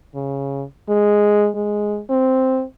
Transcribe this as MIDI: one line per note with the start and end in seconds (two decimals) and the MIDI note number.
0.15 0.63 49
0.89 1.48 56
1.55 2.00 56
2.10 2.63 60